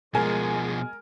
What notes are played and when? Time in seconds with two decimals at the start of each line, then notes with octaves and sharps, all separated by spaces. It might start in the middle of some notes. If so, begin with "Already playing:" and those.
0.15 B2 F3 G#3 A#4 G#5